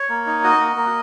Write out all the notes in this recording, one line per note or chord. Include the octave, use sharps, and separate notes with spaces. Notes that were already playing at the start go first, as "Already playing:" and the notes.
Already playing: C#5
A#3
D#4
F#4 D#5
A#3
A#3